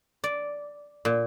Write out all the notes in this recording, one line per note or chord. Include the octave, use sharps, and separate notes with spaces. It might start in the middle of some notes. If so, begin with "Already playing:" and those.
D5
A#2